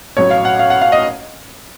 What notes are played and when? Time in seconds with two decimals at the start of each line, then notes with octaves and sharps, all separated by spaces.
0.17 A1 A2 F#3 C#5
0.30 F5
0.45 F#5
0.59 F5
0.70 F#5
0.81 F5
0.92 D#5